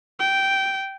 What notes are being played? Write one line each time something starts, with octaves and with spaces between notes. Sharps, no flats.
G5